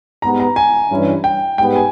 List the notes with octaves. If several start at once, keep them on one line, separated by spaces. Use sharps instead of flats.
G#2 G3 B3 A#5
A#5
G#5
G2 E3 G3 C#4 E4
G5
G#2 G3 B3 G5
G#5